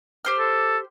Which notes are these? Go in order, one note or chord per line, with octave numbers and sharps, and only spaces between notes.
G4 C5 F6
A4